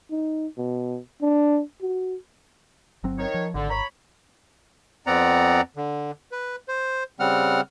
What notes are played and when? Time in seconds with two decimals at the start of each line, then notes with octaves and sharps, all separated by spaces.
0.11 D#4
0.58 B2
1.21 D4
1.81 F#4
3.03 G1 F#3 C4
3.18 D#3 C#5
3.34 F3
3.54 G#1 D3
3.69 C#5 A#5 B5
5.07 F2 B3 C4 D5 F#5 A#5
5.77 D3
6.32 B4
6.68 C5
7.20 C#3 G3 C4 F#5 F6